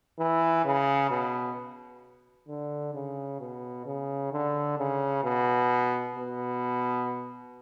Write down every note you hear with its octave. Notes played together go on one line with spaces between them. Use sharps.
E3
C#3
B2
D3
C#3
B2
C#3
D3
C#3
B2
B2